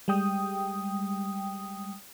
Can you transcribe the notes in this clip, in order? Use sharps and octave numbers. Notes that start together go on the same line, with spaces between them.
G3 G#3 G5 D#6